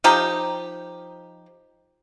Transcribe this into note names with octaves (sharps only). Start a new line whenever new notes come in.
F3 D#4 G4